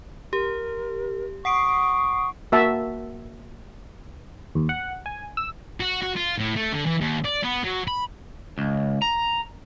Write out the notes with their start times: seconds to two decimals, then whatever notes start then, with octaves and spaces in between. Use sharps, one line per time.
0.33 G4 A#4
1.45 F#5 C#6 D#6 C7 D7
2.52 A#3 F#4 E5 A5
4.55 D#2
4.69 F#5
5.06 G#5
5.37 E6
5.80 F#4
6.02 F#4
6.16 F4
6.38 A2
6.56 A3
6.72 D3
6.86 E3
7.01 D#2
7.25 D5
7.44 B3
7.64 F#3
7.88 B5
8.58 C#2
9.02 A#5